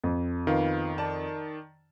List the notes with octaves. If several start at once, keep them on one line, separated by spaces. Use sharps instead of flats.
F2
D#3 B3 F4 F5
D5 A5